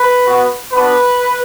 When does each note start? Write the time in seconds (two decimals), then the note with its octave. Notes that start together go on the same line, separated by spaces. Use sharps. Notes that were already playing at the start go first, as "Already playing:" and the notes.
Already playing: B4
0.24 B3 F#4
0.72 B3 D4 F#4 B4